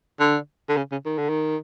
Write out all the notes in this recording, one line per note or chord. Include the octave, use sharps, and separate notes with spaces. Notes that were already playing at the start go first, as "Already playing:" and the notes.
D3
D3
C#3
C#3
D#3
D3
D#3